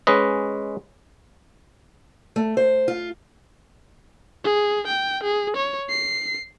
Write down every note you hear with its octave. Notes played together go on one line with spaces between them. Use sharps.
G#3 C#4 B4 D#5
A3
C5
F4
G#4
G5
G#4
C#5
C7